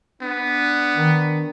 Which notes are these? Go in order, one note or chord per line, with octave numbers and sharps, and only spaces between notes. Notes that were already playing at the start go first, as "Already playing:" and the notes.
B3 D4
D#3